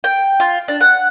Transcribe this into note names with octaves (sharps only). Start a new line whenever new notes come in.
G5
F4
D4
F#5